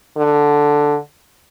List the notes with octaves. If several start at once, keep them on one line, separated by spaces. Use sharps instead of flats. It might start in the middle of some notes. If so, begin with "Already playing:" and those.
D3